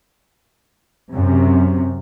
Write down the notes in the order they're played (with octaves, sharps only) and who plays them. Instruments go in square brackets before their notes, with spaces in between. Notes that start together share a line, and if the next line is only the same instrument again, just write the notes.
[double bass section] F#2 [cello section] C3